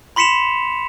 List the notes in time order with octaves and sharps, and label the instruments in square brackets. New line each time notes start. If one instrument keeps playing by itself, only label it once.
[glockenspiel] B5 C6 B6 C#7 E7 F7